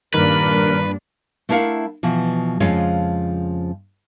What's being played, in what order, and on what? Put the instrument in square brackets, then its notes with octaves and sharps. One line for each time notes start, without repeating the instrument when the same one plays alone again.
[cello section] G2 A#2 D4 [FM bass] D#3 [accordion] A#4 [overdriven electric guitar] B4
[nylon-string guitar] A3 D4 E4 A#4 F5 F#5
B2 E3 F3
F2 C#3 F3 G#3 C#4 F4